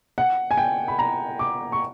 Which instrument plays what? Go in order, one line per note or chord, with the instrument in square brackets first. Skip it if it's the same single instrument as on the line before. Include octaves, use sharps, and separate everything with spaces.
[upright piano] F#5
G#5
G5
B5
A#5
D6
C#6